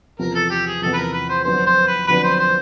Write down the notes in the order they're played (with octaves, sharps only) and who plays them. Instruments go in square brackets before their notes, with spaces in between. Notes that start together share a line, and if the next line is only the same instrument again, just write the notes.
[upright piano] E2 C3 F3 [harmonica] A#4
[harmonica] A4
G4
G#4
[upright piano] E2 C3 F3 [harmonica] A4
[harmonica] B4
A#4
B4
C5
[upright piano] F2 D3 F#3 B3 D4 [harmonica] C5
[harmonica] C5
B4
[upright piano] F2 D3 F#3 B3 D4 [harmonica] B4
[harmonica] C5
C5